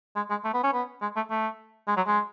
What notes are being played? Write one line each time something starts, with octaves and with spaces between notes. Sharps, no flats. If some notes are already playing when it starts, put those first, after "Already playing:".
G#3
G#3
A3
B3
C#4
B3
G#3
A3
A3
G#3
F#3
G#3